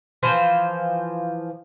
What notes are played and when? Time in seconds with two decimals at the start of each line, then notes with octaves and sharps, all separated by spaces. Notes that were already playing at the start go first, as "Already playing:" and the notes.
0.23 E3 F3 C5